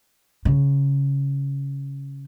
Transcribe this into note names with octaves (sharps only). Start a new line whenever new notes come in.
C#3